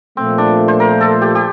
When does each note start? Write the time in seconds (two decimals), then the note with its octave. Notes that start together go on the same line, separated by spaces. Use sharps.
0.17 A#2 F3 A3 C4
0.38 D4
0.68 C5
0.80 A#4
1.01 A4
1.22 G4
1.35 G4